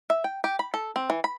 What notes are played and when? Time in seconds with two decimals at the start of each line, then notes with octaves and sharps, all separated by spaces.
0.10 E5
0.24 G5
0.44 G4
0.59 B5
0.74 A4
0.96 C4
1.10 E3
1.24 B5